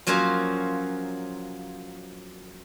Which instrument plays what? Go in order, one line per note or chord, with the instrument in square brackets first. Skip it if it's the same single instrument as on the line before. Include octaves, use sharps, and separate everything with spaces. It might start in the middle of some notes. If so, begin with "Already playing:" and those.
[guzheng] F3 F#3 A#3 C#4 F4